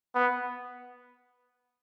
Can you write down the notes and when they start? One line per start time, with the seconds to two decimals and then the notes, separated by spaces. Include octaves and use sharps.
0.15 B3